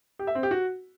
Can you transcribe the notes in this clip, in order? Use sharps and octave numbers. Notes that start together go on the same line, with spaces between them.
G4
E5
C4
G4
F#4